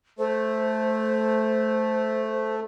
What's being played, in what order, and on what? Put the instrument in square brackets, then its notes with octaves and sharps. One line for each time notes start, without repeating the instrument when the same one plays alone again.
[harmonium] A3 [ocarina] C5